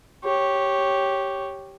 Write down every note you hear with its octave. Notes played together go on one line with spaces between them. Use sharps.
G4 C#5